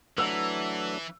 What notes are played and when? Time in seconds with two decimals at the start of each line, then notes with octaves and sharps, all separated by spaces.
0.18 E3 F#3 A3 D4 B4 F#5 A#5 E6